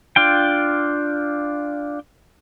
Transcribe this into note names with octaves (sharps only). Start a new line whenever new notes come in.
D4 F4 G5